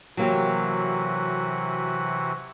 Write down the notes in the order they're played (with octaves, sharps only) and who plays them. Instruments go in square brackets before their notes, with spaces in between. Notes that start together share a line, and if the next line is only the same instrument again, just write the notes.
[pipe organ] C3 E3 F#4 [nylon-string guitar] F#3 A#3 G4